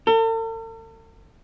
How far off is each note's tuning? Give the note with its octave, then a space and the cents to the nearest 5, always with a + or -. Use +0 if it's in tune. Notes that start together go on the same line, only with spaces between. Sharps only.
A4 +45